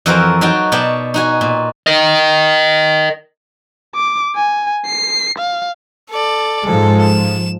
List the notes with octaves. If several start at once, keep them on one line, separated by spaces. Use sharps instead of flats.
F2 E3 F#4 A#4 C5 A5
F#3 D#4 F#4 G5 A5
B2 C#5 D5 G5 A5
D#4 F#4 G#5
A#2
A#4 D#5
D6
G#5
C7
F5
A4 D5
G#2 F3 G#3 A4
E7